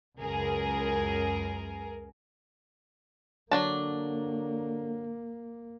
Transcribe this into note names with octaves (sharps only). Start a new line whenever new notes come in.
C#2 F#2 G#4 A#4
D3 F#3 A#3 D4 A5